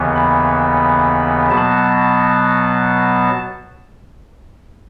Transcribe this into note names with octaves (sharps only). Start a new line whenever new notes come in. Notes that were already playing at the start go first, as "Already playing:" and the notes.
Already playing: D#2 C#3 E3 B3
B5
B2 F#3 B3 A5